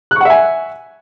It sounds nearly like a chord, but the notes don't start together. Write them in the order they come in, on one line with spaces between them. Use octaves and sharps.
F#6 C#6 F#5 E5 G#5